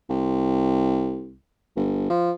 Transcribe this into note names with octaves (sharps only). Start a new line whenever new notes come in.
C2
G1
F3